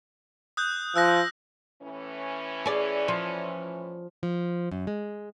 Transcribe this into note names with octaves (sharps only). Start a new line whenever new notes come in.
D#6 F#6 G6
F3 E6 F#6 A#6
A2 E3 C#4
G#4 D5
F3
F3
F#2
G#3